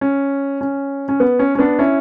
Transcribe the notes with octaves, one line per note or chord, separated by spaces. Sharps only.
C#4
C#4
C#4
B3
C#4
C#4
B3 D4
C#4 E4